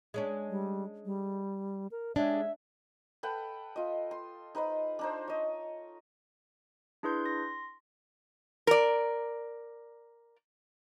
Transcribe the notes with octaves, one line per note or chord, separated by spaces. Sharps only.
G#3 C#4 D4
G3
G3
A#4
G#3 C#4 D4 G4 E5
A4 B4 F#5 G5
F4 D#5
C6
D#4 B4 C5 D#5
D4 D#4 C5
C#5 D#5
D4 E4 G#4 B4 C6 G6
C6 A#6
A#4 D5